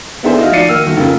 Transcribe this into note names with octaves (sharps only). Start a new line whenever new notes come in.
B3 D4 E4 G#4 A4 C5
D#4 E4 F#4 F5
F3 F#4 D5 C7 C#7 D#7
D#3 A#3 E6 F6 D#7
G1 F#4
F1 C#3 A#3 F4